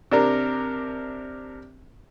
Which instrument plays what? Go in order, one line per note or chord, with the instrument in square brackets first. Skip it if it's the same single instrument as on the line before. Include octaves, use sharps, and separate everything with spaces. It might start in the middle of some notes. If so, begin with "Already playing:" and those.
[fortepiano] C3 D4 A#4